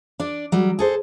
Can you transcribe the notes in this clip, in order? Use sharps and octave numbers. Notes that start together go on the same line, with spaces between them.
D4 D5
F#3 G3
G#4 A4 C5